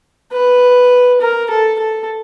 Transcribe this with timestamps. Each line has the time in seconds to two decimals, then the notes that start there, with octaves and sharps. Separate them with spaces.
0.32 B4
1.21 A#4
1.50 A4
1.79 A4